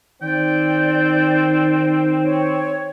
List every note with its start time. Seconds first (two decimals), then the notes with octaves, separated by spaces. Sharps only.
0.22 D#3 C4 D5 G5
2.23 C#5